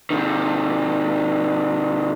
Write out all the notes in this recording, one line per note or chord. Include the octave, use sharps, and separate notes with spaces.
C3 D#3